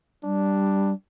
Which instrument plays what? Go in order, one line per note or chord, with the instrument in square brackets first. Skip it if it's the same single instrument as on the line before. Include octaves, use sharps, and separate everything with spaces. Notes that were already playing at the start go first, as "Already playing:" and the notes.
[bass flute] G3 [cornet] D4